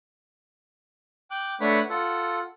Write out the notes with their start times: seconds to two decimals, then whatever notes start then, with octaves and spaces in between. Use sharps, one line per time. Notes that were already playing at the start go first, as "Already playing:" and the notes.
1.31 G5 D6 F#6
1.61 A3 D4 B4 C#5 F#5 B5
1.90 F4 A4 F#5